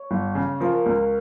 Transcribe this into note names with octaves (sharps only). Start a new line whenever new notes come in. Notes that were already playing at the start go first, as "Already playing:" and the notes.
Already playing: C#5
G1
C#3
F3 A#4
C#2